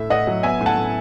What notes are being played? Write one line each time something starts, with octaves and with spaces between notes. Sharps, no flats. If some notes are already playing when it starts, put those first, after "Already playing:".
Already playing: A2 A3 E5
A2 D#5 F#5
F#3
B3 E5 G#5
A2
F#5 A5
A2